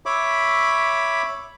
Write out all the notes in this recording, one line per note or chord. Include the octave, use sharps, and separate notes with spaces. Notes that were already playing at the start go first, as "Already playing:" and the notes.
C#5 E5 B5 D6